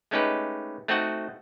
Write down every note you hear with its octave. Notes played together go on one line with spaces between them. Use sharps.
G#3 A3 C#4 D#4 G4 B4
A3 C4 D#4 F#4 D#5 F#5